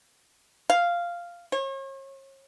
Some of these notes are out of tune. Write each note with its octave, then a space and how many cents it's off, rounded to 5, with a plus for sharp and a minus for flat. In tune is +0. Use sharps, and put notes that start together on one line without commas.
F5 -5
C#5 -40